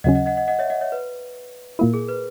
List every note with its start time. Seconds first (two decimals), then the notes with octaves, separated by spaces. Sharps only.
0.04 D#2 C#3 F#3 C#4 D#5 F#5
0.15 D#5 F#5
0.26 D#5 F#5
0.37 D#5 F#5
0.48 D#5 F#5
0.59 C#5 E5
0.70 D#5 F#5
0.81 C#5 E5
0.92 B4
1.79 A#2 A#3 E4 A#4
1.94 G#4
2.08 B4